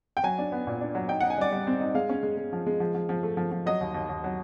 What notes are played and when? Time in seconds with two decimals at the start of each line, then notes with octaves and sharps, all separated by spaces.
0.17 G5
0.23 F#3 G#5
0.38 D4
0.52 B3
0.67 A#2
0.81 D4
0.95 F#3
1.09 D#4 G5
1.21 D#4 F#5
1.30 G#5
1.38 G3 D5
1.52 G3
1.67 C4
1.80 D#4
1.94 G#3 F5
2.09 C#4
2.23 G#3
2.37 G#3
2.53 F3
2.66 G#3
2.80 F3
2.95 F3
3.09 F3
3.23 A3
3.37 F3
3.51 F3
3.66 F#3 D#5
3.81 D#2
3.94 D#2
4.09 D#2
4.24 F#3